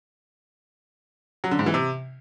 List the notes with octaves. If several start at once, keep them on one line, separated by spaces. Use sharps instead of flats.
F#3
D3
G#2
E3
C3